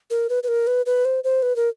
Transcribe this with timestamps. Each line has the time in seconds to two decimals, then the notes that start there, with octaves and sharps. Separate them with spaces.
0.10 A#4
0.29 B4
0.43 B4
0.48 A#4
0.67 B4
0.86 B4
1.05 C5
1.24 C5
1.42 B4
1.56 A#4